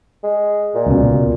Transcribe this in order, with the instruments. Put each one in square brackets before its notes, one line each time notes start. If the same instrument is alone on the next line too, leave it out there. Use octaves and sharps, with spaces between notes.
[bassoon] G#3
A#2
[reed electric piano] C#2 B2